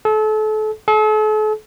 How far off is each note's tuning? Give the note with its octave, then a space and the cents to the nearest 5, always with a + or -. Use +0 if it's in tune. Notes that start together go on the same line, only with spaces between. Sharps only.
A4 -30
A4 -40